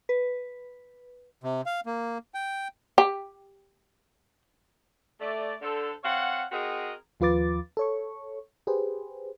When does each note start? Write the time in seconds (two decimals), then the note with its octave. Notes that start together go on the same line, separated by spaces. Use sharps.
0.09 B4
1.44 C3
1.66 F5
1.86 A#3
2.34 G5
2.98 G4
5.21 A3 D5
5.62 D3 A4 C5
6.03 C4 C#5 F5 F#5
6.52 C4 F#4 G#4 A#4 D#5
7.20 D#2 F3 F4 B4 D6 A6
7.77 A4 C#5 C#6
8.67 G4 G#4 B4 C5